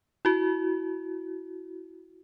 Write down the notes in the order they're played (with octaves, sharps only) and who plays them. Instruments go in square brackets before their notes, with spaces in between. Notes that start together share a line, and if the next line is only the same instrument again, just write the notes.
[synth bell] E4 F#4